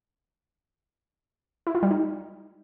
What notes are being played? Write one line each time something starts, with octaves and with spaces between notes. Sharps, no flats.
E4
F4
G3
D#4